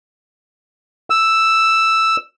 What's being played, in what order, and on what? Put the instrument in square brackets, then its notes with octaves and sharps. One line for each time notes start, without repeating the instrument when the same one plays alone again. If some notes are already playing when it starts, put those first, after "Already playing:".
[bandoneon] E6